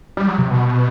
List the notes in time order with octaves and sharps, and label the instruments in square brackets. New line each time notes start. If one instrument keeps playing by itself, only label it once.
[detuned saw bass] G3
F#3
C3
B2